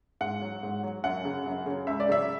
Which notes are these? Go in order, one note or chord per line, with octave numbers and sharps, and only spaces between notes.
G#2 F#5
F#3
G#2
F#3
F#2 F#5
C#3 F#3
F#2
C#3 F#3
C#2 E5
D5
C#3 F#3 E5